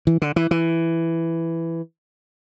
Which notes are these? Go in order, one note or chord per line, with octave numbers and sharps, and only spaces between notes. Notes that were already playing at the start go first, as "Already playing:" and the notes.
E3
D3
E3
E3